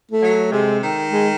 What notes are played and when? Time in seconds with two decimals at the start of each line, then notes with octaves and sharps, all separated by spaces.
0.11 A3
0.22 F#3
0.51 C3 G#3
0.82 D#3
1.11 G#3